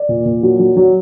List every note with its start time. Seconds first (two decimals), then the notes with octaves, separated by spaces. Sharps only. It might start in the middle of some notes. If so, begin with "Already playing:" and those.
Already playing: D5
0.09 A#2
0.26 A#2
0.43 F#3
0.59 F#3
0.77 F#3